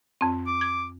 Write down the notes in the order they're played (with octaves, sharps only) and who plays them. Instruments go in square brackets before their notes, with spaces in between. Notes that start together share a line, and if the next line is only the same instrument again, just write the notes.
[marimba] F2 C4
[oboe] D6
[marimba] G#6